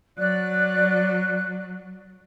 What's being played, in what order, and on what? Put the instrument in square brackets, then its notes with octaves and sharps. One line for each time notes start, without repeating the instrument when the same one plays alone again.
[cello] F#3 [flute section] D5 F#6